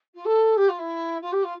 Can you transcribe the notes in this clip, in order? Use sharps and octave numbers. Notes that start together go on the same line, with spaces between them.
F4
A4
G4
F4
E4
F4
G4
F4